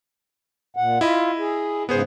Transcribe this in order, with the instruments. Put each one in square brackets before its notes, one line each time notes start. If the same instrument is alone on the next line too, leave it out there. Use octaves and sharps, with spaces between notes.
[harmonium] A#2 F#5
[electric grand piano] E4 D#5 B5 [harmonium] F4
[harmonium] G#4
[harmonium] G#2 C#3 [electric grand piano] B3 G#4 C5